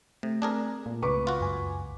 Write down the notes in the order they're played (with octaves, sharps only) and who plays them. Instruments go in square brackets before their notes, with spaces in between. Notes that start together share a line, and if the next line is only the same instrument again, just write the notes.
[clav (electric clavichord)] C3 [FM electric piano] A3
[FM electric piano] A3 C4 [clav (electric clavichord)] D4 G#4 A#4
[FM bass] A#2
[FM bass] C#2 [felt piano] B4 C#6 D6
[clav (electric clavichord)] F4 F#4
[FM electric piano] F#2 G#5